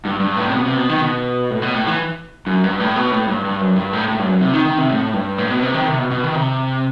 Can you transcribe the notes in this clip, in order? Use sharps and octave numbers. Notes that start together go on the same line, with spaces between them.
G2
G2
A2
C3
B2
C3
B2
D#3
B2
A2
B2
A2
E3
F#2
G2
A2
B2
A2
G2
G2
F#2
G2
A2
A2
G2
F#2
C3
D#3
D#3
C3
A2
G2
A2
B2
C3
D#3
C3
B2
B2
D#3
C3